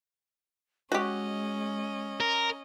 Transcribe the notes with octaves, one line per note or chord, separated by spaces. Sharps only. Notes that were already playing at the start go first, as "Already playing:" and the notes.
G#3 C#4 F#4 G4 D#5
A#4